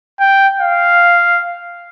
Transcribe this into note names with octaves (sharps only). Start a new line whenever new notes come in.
G5
F5